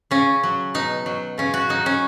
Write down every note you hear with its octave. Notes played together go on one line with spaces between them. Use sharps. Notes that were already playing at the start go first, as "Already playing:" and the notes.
C#3 C#4
F#3
B2 D#4
F#3
C#3 C#4
F#4
F#3 D#4
C#4